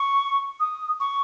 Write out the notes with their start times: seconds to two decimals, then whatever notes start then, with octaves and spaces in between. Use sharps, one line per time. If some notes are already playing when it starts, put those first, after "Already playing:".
Already playing: C#6
0.60 D#6
1.00 C#6